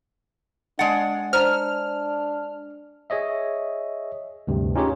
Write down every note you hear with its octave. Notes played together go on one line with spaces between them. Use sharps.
G#3 D4 F#5 A6 D7
D4 C5 A#5 F6
G#4 C#5 D#5 E5
D2 G2 C3
C#4 D#4 F4 G4 G#4 C#5